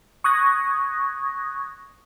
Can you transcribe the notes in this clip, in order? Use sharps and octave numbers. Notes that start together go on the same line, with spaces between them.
C#6 D#6 F#6 G#6 A#6